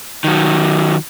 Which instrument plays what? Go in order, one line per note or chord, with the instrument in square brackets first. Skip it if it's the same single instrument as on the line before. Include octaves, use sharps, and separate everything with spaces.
[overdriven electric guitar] D#3 F#3